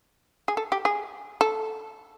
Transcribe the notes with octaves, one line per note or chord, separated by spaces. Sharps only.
G#4
A4
G4
G#4
A4